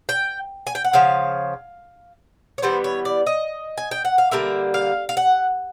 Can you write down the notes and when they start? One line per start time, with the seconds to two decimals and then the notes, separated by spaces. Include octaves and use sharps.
0.09 G5
0.67 G#5
0.75 G5
0.84 F#5
0.93 C#3 F3 F5
2.58 C#5
2.62 E3 G3 B3 C5
2.84 C#5
3.05 D5
3.27 D#5
3.78 G#5
3.91 G5
4.05 F#5
4.18 F5
4.31 D3 G3 A#3 E5
4.74 F5
5.09 F5
5.17 F#5